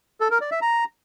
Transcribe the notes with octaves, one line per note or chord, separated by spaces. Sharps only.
A4
A#4
D5
E5
A#5